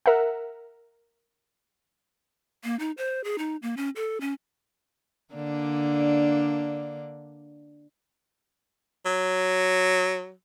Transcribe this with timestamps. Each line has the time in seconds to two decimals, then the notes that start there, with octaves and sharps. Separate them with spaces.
0.06 A#4 E5 F#5
2.64 A#3
2.79 D#4
2.97 C5
3.24 G#4
3.38 D#4
3.62 A#3
3.77 C#4
3.96 A4
4.21 C#4
5.34 D3 A#3 D4
9.06 F#3